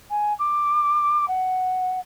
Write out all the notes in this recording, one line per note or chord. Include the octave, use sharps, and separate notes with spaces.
G#5
D6
F#5